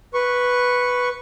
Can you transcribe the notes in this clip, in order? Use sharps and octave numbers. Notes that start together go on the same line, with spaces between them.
B4 C#6